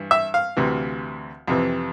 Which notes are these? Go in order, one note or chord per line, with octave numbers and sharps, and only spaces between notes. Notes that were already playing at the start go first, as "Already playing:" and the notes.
Already playing: G2 E3
E5
F5
D2 C3 E3
F2 C3 E3